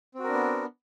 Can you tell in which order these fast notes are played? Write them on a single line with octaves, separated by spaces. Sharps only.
C4 F#4 A#4 D4 B3